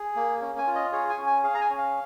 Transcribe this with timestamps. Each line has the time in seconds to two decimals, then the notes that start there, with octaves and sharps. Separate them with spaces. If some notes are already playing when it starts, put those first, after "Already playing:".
Already playing: G#4
0.16 A#3
0.41 C#4
0.58 G#5
0.67 F4
0.75 D#5
0.92 G#4 C#5
1.10 G#5
1.18 C#4
1.27 G#5
1.44 G#4 F5
1.55 A#5
1.61 G#5
1.70 C#4
1.78 F5